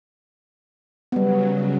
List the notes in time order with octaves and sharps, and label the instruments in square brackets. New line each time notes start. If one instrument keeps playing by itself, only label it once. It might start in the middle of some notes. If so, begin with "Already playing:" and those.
[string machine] C#3 F#3 [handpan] G3 B3